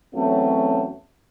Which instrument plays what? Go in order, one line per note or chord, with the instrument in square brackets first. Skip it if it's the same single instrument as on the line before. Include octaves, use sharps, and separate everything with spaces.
[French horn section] E2 F#3 A3 C4 C#4